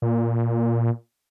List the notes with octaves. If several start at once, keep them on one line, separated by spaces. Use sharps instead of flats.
A#2